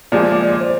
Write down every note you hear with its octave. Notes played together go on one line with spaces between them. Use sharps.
A#2 F3 G#3 D5
D5
D5
C5